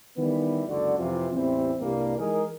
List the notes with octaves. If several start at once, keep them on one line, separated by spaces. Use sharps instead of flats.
D#3 E3 G3 B3
F#1 C#2 D3 F#4 D5
F2 C3 E3 F4
A1 E2 E3 G3 C4
C2 G2 G3 A#3
E3 G#3 D#4 G#4 A#4